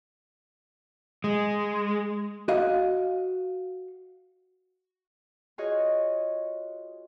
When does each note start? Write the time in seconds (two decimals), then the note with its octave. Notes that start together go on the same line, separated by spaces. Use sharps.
1.24 G#3
2.48 F#4 D#5 F5
5.58 F4 F#4 G#4 C#5 D#5